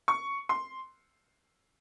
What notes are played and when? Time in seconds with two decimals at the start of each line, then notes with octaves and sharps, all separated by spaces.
0.08 C#6
0.49 C6